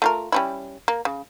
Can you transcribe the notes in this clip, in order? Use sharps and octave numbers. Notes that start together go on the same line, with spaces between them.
A3 F4 A#4
G3 C#4 E4
A#3
C#3